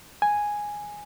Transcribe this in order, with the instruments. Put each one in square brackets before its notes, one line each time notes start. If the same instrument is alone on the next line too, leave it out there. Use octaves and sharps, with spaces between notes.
[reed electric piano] G#5